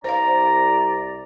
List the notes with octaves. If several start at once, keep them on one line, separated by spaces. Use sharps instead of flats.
C2 C3 C5 D5 F5 A#5